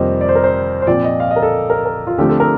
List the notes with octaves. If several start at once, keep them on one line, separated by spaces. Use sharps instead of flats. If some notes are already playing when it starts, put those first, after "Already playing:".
Already playing: F2 C3 D#3 G3 A#3 G4 C5 D#5
D5
C5
A#4
C5
C5
A#2 F3 C4 D5
D#5
F5
D#5
A#4
A4
A#4
A#4
F4
D3 F3 A3 C4 G4
A4
A#4